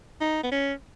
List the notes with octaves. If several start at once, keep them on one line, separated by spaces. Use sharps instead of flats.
D#4
B3
C#4